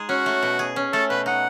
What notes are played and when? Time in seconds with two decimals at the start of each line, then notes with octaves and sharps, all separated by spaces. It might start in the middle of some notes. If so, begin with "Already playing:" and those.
Already playing: G#3 D#4 G#4
0.09 C#4 F#4
0.26 A3
0.43 B2
0.59 G#4
0.76 C#4
0.93 A3 A4
1.09 B2 B4
1.26 D#4 F#5